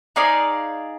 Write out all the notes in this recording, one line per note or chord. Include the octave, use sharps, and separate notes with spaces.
D#4 G#4 D5 F5